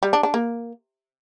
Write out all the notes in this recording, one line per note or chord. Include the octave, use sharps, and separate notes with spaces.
G3
D4
D4
A#3